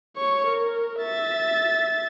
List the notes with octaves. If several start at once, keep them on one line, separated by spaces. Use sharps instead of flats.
C#5 C#6
A#4
E5 A6